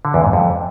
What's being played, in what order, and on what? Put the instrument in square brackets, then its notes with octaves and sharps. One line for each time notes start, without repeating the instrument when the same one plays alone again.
[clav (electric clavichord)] D3
E2
G#2
F2